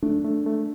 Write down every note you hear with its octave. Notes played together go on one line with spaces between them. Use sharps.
A3 D4
A3
A3